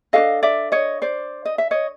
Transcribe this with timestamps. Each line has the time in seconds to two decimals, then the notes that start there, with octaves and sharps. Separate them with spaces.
0.13 D4 F#4 A4 D#5 F5
0.43 D5 E5
0.72 C#5 D#5
1.02 C5 D5
1.45 D#5
1.58 E5
1.71 C#5 D#5